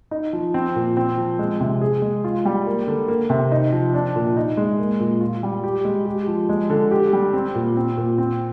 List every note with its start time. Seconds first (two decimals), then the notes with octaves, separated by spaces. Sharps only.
0.11 D#4
0.33 F3
0.54 C4
0.76 A#2
0.97 C4
1.17 F3
1.39 G#3
1.60 C3
1.81 G#4
2.02 G#3
2.24 F4
2.45 G3
2.67 A#3
2.87 D3
3.08 A#3
3.30 C3
3.52 D#4
3.72 F3
3.94 D4
4.16 A#2
4.37 D#4
4.57 G#3
4.79 A#3
5.00 A#2
5.21 F4
5.43 G3
5.64 G4
5.85 G#3
6.06 G4
6.28 F3
6.49 G#3
6.70 D3
6.91 G4
7.13 G3
7.34 C4
7.55 A#2
7.77 C4
7.97 A#2
8.18 C4